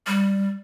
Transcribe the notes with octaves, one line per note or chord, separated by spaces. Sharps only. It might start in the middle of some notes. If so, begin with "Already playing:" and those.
G3